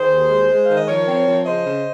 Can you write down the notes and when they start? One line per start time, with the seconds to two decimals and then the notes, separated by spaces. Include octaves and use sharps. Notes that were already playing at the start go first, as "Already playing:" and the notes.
Already playing: D#3 G#4 C5
0.11 D#2
0.29 G#3
0.49 G#3
0.65 D#3 F5
0.76 D#5
0.88 F3 A#4 C#5
1.07 C4
1.26 F3
1.46 C#3 C5 D#5
1.65 C#3